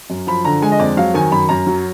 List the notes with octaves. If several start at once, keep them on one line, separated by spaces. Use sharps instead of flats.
F#2
F3 B5
D3 A#5
G#3 G#5
D#5
F2 D5
F#3 F5
D#3 G#5
F#2 B5
F#2 A#5
F#3